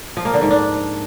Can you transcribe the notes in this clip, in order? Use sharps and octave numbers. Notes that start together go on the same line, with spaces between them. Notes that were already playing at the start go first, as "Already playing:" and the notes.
F3
A#3
D3
G#2
D4